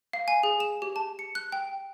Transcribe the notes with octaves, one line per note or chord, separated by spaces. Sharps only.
F5
G#5
G#4
E7
G4
A5
C#7
F#6
G5